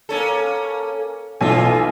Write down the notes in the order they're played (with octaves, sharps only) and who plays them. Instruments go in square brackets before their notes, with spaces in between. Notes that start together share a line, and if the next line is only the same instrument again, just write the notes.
[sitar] A#3 C#4 A4
[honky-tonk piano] B1 A4 G#5 [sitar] E3 F4